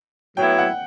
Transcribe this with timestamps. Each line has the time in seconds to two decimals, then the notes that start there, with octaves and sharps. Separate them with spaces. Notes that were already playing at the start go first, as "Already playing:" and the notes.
0.37 A2 F#3 B3 E4 G5
0.58 F#5